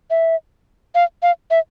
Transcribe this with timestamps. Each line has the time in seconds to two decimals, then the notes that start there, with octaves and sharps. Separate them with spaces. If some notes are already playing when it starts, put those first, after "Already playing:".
0.10 E5
0.95 F5
1.23 F5
1.51 E5